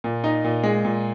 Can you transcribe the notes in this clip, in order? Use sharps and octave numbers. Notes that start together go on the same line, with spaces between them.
A#2
D#4
A#2
G#3
A#2